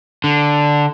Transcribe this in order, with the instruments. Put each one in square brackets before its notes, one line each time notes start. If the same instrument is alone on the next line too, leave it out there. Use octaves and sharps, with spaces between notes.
[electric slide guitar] D3